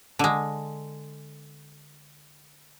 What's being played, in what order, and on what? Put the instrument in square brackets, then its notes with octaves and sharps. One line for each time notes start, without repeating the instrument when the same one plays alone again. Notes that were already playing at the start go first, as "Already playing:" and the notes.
[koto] D3 G#3